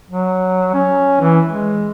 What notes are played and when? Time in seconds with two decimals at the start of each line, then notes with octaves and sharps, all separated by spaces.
0.10 F#3
0.74 C#4
1.21 E3
1.47 G#3